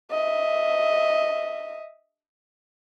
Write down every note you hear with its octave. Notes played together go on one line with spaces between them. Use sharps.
D#5 E5